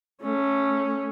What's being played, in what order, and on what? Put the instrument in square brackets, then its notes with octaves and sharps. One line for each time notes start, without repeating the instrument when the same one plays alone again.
[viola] A3 C#4